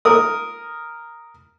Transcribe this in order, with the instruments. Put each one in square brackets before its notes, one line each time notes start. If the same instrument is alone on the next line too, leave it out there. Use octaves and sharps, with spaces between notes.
[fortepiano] A#4 D#6